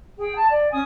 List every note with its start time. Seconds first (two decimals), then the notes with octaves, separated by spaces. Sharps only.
0.19 G#4 G5
0.34 A5
0.49 D5
0.71 C#4 G#5 D#6